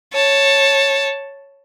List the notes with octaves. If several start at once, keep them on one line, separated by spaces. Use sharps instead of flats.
C#5 A5